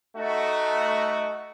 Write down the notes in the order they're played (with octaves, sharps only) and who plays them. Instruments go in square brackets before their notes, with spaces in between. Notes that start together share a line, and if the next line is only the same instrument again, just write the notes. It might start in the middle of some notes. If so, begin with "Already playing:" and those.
[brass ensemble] A3 D#4 F#4